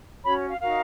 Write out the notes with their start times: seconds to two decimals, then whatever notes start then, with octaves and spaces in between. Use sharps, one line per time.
0.25 C#4 F#4 C#5 B5
0.49 F5
0.60 D#4 F#4 A#4 F5